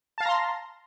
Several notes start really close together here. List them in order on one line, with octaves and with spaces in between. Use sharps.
A5 F5 A#6 A#5 C6